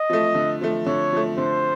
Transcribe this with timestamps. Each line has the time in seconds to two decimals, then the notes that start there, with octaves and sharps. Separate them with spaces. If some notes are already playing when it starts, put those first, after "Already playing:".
Already playing: D#5
0.10 F3 A3
0.35 D3
0.61 F3 A3
0.86 D3 C#5
1.12 F3 A3
1.38 D3 C5